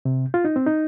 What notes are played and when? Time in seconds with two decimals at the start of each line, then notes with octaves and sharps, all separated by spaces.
0.05 C3
0.34 F4
0.45 D#4
0.56 C4
0.66 D#4